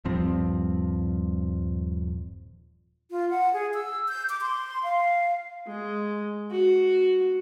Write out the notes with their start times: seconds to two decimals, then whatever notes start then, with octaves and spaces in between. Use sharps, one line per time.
0.05 D#1 G2 F3 C4
3.11 F4
3.30 F#5
3.53 G#4
3.74 E6
4.09 G6
4.30 D6
4.41 C6
4.83 F5
5.67 G#3
6.51 F#4